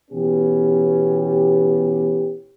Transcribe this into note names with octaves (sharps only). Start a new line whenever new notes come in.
B2 E3 B3 C#4 G4